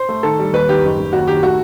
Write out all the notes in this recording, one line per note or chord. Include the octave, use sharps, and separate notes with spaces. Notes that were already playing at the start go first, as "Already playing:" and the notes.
Already playing: C5
A3
D#3 A4
G3
D#2 B4
D#3 G4
F#1
F#1
D#2 F#4
D#3 G4
A3 F#4